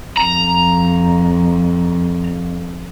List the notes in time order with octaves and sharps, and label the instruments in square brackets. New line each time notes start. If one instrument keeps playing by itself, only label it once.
[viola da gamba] F2 [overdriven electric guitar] A#5